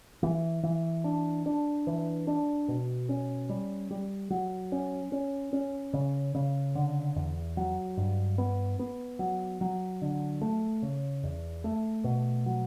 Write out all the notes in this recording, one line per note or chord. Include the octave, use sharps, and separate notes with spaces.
E3
E3
D4
D4
E3
D4
B2
C#4
G3
G3
F#3
C#4
C#4
C#4
C#3
C#3
D3
E2
F#3
G2
B3
B3
F#3
F#3
D3
A3
C#3
E2
A3
B2
F#3